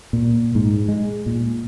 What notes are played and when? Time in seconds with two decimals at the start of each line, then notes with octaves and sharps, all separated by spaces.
0.13 A#2
0.55 G#2
0.88 G#3
1.26 A#2